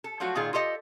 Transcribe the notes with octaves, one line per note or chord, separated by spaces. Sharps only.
A4
F3 F#3 A3 F4 F#4
A#2 D#3 F4 G#4
F4 G4 A4 D#5